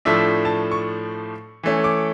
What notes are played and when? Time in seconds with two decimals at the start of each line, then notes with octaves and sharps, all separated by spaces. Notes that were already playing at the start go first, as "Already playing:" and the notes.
0.05 A2 F3 A3 D4 E5
0.45 A5
0.71 C#6
1.63 E3 A3 C#4
1.84 D6